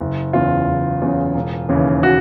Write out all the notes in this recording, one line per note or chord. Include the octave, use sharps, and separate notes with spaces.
F#1
E2 C#3 F4
F#1
E2 C#3
E1
D#2 C#3 E3
F#4